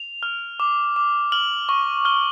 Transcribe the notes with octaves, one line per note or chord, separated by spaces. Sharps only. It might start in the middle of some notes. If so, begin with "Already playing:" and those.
Already playing: F7
F6
D6
D6
F6 F#7
C#6
F6 G7